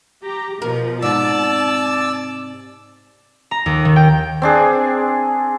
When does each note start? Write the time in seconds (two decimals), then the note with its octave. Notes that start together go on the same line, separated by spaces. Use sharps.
0.24 G4 A#5
0.62 B2 F3 A#4
1.02 G#2 C3 D5 A5 E6
3.51 A#5
3.66 D#2
3.85 D#3
3.96 G5
4.42 C4 D4 G#4